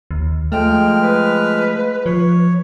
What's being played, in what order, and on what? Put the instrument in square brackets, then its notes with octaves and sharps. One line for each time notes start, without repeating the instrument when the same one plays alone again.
[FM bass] D#2
[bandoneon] F3 G#3 F6 [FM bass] A3 [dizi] G5
[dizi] B4
[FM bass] F3 [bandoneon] C#5